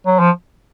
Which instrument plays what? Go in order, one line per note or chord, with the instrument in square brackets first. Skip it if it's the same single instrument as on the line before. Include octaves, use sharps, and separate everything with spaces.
[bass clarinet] F#3
F3